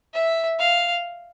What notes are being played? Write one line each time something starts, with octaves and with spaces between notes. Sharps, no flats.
E5
F5